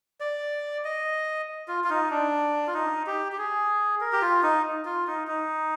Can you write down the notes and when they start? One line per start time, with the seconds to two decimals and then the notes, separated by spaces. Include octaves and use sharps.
0.20 D5
0.85 D#5
1.68 F4
1.84 F4
1.90 D#4
2.10 D4
2.67 F4
2.74 D#4
3.07 G4
3.32 G4
3.38 G#4
4.01 A#4
4.13 G4
4.22 F4
4.43 D#4
4.85 F4
5.07 D#4
5.28 D#4